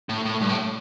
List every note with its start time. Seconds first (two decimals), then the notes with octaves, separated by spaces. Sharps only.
0.09 A2
0.25 A2
0.41 G2
0.49 A2